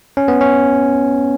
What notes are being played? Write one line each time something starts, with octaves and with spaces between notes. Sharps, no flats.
C#4
B3
C#4